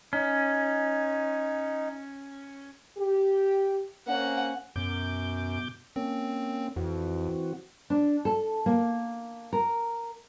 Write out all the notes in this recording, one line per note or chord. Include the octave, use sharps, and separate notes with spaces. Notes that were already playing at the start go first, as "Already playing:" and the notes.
C#4 D#4
G4
A#3 C4 C#4 F#5
F#2 B2 D6 G6
A#3 C4 C#4
F2 E3 C4 F#4
D4
A4
A#3
A#4